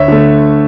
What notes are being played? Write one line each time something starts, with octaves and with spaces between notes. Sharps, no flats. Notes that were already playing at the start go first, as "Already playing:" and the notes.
Already playing: D2 C#5 E5
D3 A3